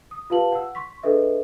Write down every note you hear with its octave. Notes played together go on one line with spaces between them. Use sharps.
D#6
F4 G4 B4 F5 A5 F#7
F#5 E6
C6 C#6 B6
D4 G#4 A4 B4 D#5 E5